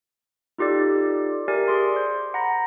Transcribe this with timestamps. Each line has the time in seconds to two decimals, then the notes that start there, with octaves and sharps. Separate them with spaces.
0.58 D#4 F4 G4 A4 D5
1.48 G4 A#4 D5 E5 G#5
1.68 G#4 C6
1.96 C5
2.34 F#5 A#5 B5 A#6